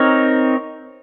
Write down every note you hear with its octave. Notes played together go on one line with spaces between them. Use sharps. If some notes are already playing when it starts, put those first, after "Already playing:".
Already playing: C4 D#4 A#4 C#5